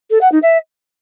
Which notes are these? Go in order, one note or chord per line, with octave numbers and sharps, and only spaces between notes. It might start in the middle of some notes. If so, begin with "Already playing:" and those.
A4
F#5
D#4
E5